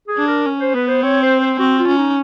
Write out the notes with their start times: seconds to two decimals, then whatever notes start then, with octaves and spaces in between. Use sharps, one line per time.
0.08 G#4
0.18 D4
0.28 A#4
0.46 C#4
0.60 C5
0.74 B3 B4
0.88 C5
1.03 C4 C#5
1.22 C5
1.41 C5
1.59 C4 F#4
1.79 F4
1.88 C#4
1.98 D#4